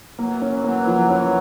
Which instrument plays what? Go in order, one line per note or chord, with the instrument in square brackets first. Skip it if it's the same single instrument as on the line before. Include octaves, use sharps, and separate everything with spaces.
[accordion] E3 F#3 [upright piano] A#3
[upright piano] C#4
[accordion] E3 F#3 [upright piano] A#3
[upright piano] F3
C#4